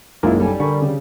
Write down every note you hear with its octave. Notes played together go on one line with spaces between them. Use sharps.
F#1 B1 G#3 A#3 E4 F4
G3 A4 G#5
D3 A#4 B5 C#6
C#3